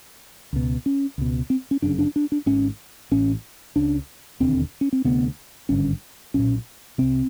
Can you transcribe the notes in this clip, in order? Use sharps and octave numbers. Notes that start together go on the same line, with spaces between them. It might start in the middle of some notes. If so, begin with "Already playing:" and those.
C#2 B2
C#4
C#2 B2
C4
C#4
G1 F#2 C#3 D4
D4
D4
D4
G#1 G#2 C#4
A1 A2 C#4
C#2 C#3 D4
E1 D#2 D3 C4
C#4
C4
D2 C3 B3
G#1 G2 D3 C#4
B1 A#2 C#4
C2 C3 C4